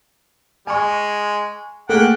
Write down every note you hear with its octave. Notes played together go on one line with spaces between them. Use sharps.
G#3 G#5 C#6
A3 A#3 G#4 F#5 G5 A5